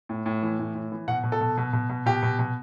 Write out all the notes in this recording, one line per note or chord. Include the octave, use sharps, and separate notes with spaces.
A2
A2
E3
A2
A2
E3
B2 F#5
B2
A4
B2
B2
B2
B2
B2 G4
B2
B2